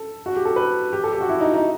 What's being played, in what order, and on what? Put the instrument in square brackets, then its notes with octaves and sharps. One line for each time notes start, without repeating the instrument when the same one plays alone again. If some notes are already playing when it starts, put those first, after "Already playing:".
Already playing: [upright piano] A4
F#4
G4
A4
B4
G4
A4
G4
F#4
E4
D#4
D#4